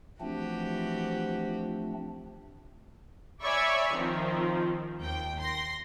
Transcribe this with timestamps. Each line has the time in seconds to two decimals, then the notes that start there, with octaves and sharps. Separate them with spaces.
0.21 E3 F3 A3 C4 D4 F#4 G4
3.43 C#5 D5 E5 G#5 B5 C#6
3.93 D#3 F3 C4
4.99 D#2 G5
5.40 C6 A#6